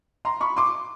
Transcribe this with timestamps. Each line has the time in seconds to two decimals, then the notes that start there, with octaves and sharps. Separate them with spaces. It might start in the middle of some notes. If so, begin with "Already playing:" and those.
0.25 A#5 C6
0.41 B5 C#6
0.57 C6 D6